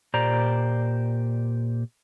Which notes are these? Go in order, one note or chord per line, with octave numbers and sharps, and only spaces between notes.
A#2 G4 C5 D5 A#5